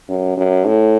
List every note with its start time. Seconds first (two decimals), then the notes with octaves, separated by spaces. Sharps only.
0.09 F#2
0.37 F#2
0.66 A2